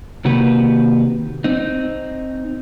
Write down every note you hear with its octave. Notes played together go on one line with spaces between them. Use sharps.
C3 D#3 A#3 F#4 G4 B4
C4 D#4